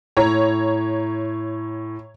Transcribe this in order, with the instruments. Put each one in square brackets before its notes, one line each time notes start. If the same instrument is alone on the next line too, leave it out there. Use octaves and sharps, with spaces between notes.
[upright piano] A2 [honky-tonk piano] C#5 A#5